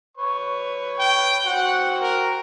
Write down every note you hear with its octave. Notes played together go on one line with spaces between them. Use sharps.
B4 C#5 C#6
G5
F#4 C5 F#5 G5
A#4